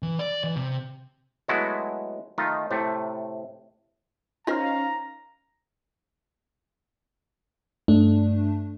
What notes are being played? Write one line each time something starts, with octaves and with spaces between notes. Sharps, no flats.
E3
D5
E3
C3
F#3 G#3 A3 B3 E4 F#4
D#3 A3 D#4 F4
A2 C3 A3
C#4 D#4 F4 A#4 C5 F5 A#5 F6
G2 A3 D4